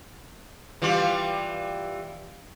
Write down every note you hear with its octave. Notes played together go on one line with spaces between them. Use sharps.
E3 G3 F4